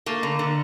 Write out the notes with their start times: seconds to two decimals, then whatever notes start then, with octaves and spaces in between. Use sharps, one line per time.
0.06 A3 A#3
0.23 D3
0.39 D3